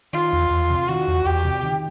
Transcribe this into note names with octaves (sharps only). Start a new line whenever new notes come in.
D#3 F4
E2
E2
C3
D#3 F#4
E2
E2 G4
C3
D#3